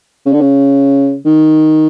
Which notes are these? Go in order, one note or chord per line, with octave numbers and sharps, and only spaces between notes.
C#3
D3
C#3
D#3